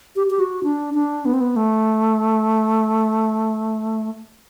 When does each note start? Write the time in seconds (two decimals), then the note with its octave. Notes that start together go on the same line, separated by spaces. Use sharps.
0.16 G4
0.30 G4
0.39 F#4
0.64 D4
0.94 D4
1.25 B3
1.34 C4
1.41 B3
1.56 A3